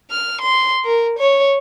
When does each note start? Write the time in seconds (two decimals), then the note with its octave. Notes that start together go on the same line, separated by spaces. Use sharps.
0.11 F6
0.41 C6
0.85 A#4
1.19 C#5